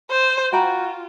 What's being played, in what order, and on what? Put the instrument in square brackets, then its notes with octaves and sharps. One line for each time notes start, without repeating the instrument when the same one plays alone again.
[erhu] C5
[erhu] F4 [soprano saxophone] F#4 [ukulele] G5 A#5 B5